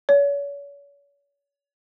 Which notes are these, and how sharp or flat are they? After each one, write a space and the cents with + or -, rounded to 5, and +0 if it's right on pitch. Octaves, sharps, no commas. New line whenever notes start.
C#5 +40